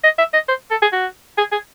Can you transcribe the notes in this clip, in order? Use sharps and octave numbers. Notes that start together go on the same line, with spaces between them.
D#5
E5
D#5
C5
A4
G#4
F#4
G#4
G#4